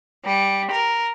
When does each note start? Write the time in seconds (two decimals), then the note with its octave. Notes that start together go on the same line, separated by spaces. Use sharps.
0.25 G3
0.71 A#4